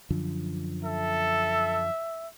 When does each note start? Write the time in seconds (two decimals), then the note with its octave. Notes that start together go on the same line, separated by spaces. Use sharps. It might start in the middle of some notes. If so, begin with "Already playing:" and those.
0.10 F#2 D3 F3
0.84 A4 E5